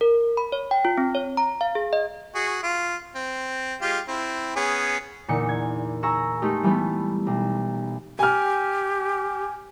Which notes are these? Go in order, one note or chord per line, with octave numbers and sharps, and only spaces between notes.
A#4
B5
C#5
G5
F4
C4
C#5
A#5
F5
G#4
D#5
F#4 G#4
F4
C4
G#3 F4 G4
C4 E4
B3 C#4 G#4
E2 A#2 D3 D#4 C#7
G#6
G#4 A#5 C#6 E6
G#3 A3 D#4 G4
E3 G3 A3 B3
B1
G4 G#5 F6